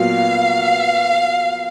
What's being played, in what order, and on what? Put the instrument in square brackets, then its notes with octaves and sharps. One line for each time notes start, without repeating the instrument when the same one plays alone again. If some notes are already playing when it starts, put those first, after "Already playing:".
Already playing: [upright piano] A#2 F#3 B3 F#4 [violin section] F5